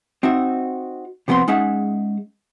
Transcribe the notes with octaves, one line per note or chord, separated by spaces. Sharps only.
C4 D#4 F#4 E5
C3 F3 B3 C4 C6
G#3 C#4 D#4 G#4 E5 F#5